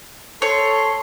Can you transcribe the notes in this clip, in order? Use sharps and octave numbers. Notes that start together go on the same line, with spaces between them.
A4 C#5 C6